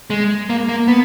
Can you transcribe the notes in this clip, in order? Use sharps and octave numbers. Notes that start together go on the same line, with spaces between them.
G#3
A#3
A#3
B3